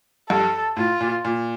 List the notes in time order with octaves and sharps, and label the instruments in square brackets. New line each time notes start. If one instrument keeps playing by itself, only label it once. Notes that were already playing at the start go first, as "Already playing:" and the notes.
[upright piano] G2 [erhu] A4
[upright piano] A2 [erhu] F4
[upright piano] A#2
A#2